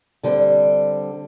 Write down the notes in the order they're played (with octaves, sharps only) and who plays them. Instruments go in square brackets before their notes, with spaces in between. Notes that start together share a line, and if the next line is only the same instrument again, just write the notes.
[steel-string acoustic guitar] D3 G3 C4